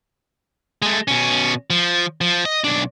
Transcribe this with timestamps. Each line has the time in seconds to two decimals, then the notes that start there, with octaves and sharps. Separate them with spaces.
0.82 G#3 A3
1.08 B2 C#4
1.70 F3
2.21 F3
2.45 D#5
2.64 B1 D4